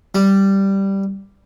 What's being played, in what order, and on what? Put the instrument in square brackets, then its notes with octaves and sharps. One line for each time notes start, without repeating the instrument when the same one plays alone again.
[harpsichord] G3